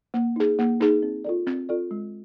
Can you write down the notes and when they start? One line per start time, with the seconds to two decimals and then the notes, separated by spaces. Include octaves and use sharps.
0.14 A#3
0.36 D#4 G#4
0.59 A#3
0.81 D#4 G#4
1.03 C4
1.25 F4 A4 D5
1.47 C4
1.69 F4 A4 D5
1.91 G#3